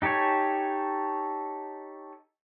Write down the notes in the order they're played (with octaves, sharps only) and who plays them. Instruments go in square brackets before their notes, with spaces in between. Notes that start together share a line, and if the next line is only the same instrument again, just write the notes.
[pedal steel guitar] D#4 G4 A4 C#5 G#5